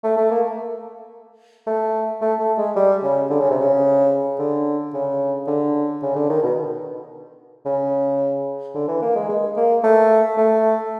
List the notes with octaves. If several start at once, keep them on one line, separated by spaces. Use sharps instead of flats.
A3
A3
A#3
A3
A3
A3
G#3
G3
C#3
D3
C#3
C3
C#3
D3
C#3
D3
C#3
D3
D#3
B2
C#3
D3
E3
A#3
G#3
G#3
A#3
A3
A3